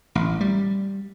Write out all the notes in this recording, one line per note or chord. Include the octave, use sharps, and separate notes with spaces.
A1
G3